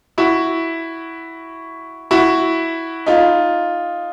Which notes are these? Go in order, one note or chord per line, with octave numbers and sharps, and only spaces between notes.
E4 F#4
E4 F#4
D#4 F4